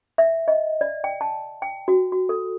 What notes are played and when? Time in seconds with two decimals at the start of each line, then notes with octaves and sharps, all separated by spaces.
0.18 E5
0.48 D#5
0.81 D5
1.04 G5
1.21 A5
1.62 G5
1.88 F#4
2.12 F#4
2.29 A4